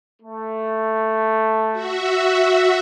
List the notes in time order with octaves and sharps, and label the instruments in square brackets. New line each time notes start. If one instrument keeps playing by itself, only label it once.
[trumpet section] A3
[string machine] F#4 E5